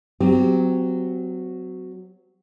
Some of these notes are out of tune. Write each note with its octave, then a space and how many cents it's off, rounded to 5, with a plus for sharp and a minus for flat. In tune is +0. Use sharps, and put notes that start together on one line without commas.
F#3 +0 C4 -35 G4 +0